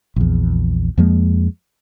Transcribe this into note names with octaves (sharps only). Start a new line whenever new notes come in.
A#1 E2
F2 F3 G#3 A#3